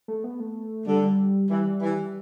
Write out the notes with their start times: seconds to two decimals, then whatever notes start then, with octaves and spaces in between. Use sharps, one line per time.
0.08 A3
0.24 B3
0.40 A3
0.87 D3 G3
1.03 G3
1.50 E3 G3
1.82 E3